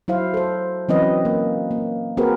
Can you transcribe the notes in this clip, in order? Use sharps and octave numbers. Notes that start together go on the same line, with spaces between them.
F#3 E4 C5 F5
A4 C5
E3 F#3 C4 C#4 B4 D#5
A#3
A#3
A#3 C4 F#4 G#4 A#4 B4